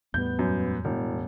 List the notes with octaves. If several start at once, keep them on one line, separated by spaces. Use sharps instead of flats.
E2 A2 G3 B3 G6
F#2
E1 E4